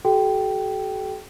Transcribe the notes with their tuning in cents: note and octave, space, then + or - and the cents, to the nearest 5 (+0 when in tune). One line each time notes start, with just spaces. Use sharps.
F#4 +35 A4 -45 G5 -10